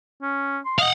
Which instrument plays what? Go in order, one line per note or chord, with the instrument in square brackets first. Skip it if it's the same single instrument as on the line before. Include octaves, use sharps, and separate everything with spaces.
[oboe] C#4
C6
[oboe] D#5 [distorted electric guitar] F5 F#5